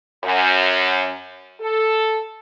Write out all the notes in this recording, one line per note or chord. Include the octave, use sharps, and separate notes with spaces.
F#2
A4